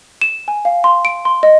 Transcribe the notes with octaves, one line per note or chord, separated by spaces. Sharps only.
E7
G#5
F5
C6
D7
C6
D#5